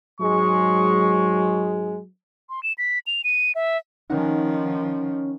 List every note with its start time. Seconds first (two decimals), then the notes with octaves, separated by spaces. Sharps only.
0.20 G#2 F#3 G#3 C#6
2.49 C6
2.63 E7
2.78 B6
3.07 F7
3.24 D#7
3.55 E5
4.10 D#3 F3 C#4 D#4 F#5